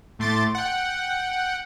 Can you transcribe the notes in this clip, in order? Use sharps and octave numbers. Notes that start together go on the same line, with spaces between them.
A2 A3 C6 D6 A6
F#5 G5